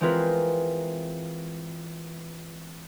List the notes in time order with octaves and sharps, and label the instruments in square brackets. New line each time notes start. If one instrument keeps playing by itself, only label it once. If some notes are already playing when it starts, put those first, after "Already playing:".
[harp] E3 G#3 C4 F4 A#4 B4